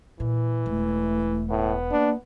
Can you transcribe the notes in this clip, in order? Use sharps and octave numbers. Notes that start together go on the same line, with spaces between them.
A#2 E3
E1 A3
A2 B3
A#3 D4